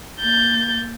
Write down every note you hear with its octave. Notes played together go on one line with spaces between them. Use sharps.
A#3 G6 A6